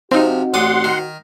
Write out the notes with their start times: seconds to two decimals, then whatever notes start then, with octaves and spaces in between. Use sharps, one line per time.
0.11 C3 F3 C4 D#4 F#4
0.54 A1 D5 F#5 C6 D#6
0.84 D#3